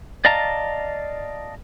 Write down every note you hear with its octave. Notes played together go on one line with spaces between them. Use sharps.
D5 D#5 F5 A5 A#5